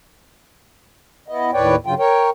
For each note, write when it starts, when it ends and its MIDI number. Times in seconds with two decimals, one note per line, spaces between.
1.28 1.51 59
1.28 1.51 64
1.28 1.51 75
1.53 1.76 39
1.53 1.76 45
1.53 1.76 71
1.53 1.76 73
1.53 1.76 74
1.53 1.76 79
1.86 1.94 43
1.86 1.94 49
1.86 1.94 54
1.86 1.94 65
1.86 1.94 79
1.99 2.30 70
1.99 2.30 73
1.99 2.30 79